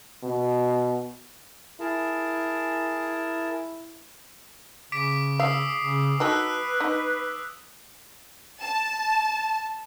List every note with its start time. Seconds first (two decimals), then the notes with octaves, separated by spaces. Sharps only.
0.23 B2
1.80 E4 G#4 A#4 A5
4.92 C#3 D6 B6 D7
5.40 F5 D#6 E6 C7
5.82 C#3
6.20 F#3 D#4 A4 B4 E6 F#6
6.81 D#4
8.62 A5